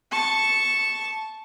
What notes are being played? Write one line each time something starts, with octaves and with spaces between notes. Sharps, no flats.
A5 C#6